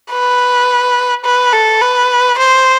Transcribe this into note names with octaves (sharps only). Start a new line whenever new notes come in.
B4
B4
A4
B4
C5